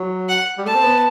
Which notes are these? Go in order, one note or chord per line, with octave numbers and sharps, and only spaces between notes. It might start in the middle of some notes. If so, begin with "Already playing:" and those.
Already playing: F#3
F#5
G3
A3 A5
C4
B3